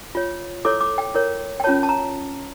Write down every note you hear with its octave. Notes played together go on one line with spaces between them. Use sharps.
F4 C#5
E4 A4 C#5 D6
D6
G5
E4 A#4 C#5
G5
C#4 F4 C#5 A5
A5
A#5